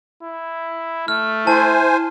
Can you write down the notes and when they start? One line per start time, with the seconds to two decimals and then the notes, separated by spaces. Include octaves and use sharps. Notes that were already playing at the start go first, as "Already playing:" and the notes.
0.23 E4
1.08 A3 F6
1.47 E4 C5 G#5 A5